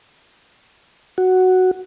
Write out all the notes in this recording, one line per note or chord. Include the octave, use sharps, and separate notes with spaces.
F#4